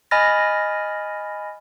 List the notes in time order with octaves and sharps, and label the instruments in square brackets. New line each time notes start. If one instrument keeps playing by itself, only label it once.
[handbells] D#5 G#5 B5 F6 A6 A#6